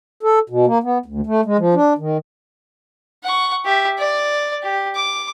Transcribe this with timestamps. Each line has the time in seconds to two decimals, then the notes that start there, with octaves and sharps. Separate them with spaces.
0.23 A4
0.50 B2
0.66 A#3
0.83 B3
1.06 D2
1.26 A3
1.45 G#3
1.58 F3
1.75 D4
1.98 D#3
3.23 F#5 C#6
3.65 G4 E5
3.99 D5
4.63 G4
4.95 D6